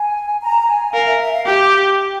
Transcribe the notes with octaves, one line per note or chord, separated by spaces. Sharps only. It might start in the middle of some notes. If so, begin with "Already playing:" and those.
Already playing: G#5
A#5
G#5
A#4 F5
E5
E5
F5
G4 G5
G5